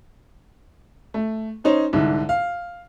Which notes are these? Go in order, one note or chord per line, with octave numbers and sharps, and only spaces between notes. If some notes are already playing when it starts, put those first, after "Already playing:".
A3
C#4 D#4 C5 C#5
C2 G#2 D3
F5